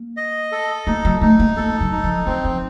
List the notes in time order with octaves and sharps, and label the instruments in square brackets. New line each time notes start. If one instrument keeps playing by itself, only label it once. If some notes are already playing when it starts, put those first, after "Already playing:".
Already playing: [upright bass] A#3
[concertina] D#5
A4
[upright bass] A#3 [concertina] D#4
[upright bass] F#3
[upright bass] A3 [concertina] D#4
[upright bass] A#3
[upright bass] A#3 [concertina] A4
[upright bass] F#3
[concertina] D#4
[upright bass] F3
[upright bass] F3 [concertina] C4
[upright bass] F3